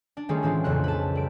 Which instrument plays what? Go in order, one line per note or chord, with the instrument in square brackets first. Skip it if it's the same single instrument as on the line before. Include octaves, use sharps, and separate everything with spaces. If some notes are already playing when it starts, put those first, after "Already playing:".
[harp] D4
D#3 G3 A3 C#4 F4 G#4
A2 E3 G#3 C4 D4 F4
B1 F2 A#2 C#3 F#6
B4 A5
G3 D7